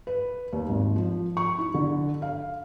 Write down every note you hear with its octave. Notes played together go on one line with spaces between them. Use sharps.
B4
D#2
G#1
F3
C#6
E4
D3
F5